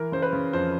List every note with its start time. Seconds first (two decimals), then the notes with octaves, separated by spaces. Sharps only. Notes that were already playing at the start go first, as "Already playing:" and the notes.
Already playing: E3 A#4
0.12 C#3 C5
0.22 B4
0.33 C#3
0.53 F2 C5